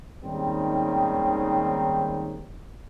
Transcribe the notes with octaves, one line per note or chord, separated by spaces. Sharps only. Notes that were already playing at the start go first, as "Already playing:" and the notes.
D#2 G#2 D#3 G3 C4 C#4